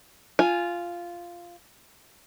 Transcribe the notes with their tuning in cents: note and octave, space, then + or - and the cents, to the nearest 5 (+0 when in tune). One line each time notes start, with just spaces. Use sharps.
F4 -5 G#5 +0